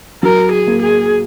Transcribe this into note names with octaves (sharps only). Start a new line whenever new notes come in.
F#3 A#4
G#4
A#3
G#4